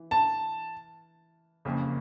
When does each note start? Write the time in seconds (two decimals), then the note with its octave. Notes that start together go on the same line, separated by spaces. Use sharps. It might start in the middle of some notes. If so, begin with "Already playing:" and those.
Already playing: E3
0.11 A5
1.65 F#1 F2 C#3 F3 A#3